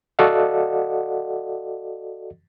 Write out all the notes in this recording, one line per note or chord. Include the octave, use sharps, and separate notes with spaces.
F#4 A4 D5 D#5 F5 F#5